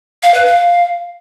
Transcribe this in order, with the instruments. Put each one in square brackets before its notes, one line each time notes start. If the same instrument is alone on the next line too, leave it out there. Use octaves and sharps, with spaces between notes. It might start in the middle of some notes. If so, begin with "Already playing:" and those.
[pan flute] F5
B4
F5